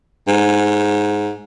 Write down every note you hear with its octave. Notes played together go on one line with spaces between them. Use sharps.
G#2